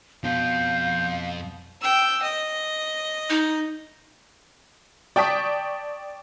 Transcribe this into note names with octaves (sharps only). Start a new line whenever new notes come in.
F2 B2 F4 F5 G6
G5 E6
D#5
D#4
D5 G5 A5 C#6 D#6 B6